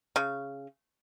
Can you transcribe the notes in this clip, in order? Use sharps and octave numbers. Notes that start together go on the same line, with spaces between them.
C#3